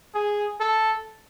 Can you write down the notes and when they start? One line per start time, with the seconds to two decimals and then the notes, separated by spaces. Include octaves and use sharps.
0.14 G#4
0.60 A4